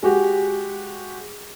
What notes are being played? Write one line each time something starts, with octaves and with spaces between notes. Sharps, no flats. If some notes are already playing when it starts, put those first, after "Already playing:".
G#3 F#4 G4